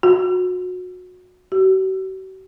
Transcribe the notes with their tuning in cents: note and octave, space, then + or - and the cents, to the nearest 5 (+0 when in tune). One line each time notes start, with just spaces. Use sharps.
F#4 -25
F#4 +45